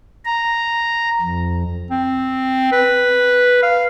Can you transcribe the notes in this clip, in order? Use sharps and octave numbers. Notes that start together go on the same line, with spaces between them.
A#5
F2
C4
B4
F5